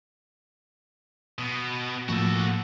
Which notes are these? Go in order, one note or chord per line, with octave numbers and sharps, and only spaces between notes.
B2
A2 F3 A#3 F#4 A4